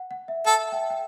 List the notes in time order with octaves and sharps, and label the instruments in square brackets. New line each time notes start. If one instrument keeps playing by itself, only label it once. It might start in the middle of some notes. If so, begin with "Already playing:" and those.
Already playing: [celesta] F#5
F#5
E5
[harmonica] A4 [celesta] F#5
[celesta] E5 G5
G5